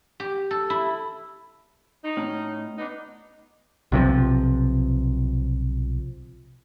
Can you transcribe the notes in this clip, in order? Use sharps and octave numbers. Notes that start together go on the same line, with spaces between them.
G4
A4
E4
D#4
A2 C#4
B3 D4 D#4
B1 C3 D#3 F3